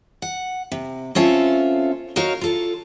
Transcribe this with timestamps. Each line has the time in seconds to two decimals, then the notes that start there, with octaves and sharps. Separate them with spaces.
0.22 F#5
0.72 C3
1.15 C4 C#4 F4 A4 E5
2.16 D#4 F#4 A#4 C#5 F5
2.41 F4 A4